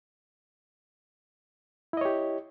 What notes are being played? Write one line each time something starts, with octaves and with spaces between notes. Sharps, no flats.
E4 G4 C#5 D#5